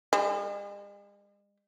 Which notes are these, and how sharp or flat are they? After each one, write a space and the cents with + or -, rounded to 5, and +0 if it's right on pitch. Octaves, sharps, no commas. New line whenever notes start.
G#3 -45